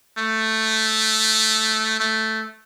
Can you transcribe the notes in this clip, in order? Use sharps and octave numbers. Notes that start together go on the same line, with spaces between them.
A3
A3